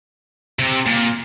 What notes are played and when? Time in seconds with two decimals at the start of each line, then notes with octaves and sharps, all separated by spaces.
0.59 C3
0.86 A#2